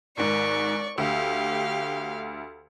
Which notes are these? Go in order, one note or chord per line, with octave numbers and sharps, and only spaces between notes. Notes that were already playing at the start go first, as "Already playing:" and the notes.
G#1 G#2 D5 C#6
D2 G4 F5